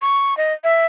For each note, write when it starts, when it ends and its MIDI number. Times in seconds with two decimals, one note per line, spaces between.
0.02 0.37 85
0.37 0.53 75
0.64 0.86 76